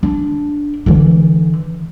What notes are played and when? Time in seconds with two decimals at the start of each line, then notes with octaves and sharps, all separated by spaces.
0.03 D4
0.86 D3 E3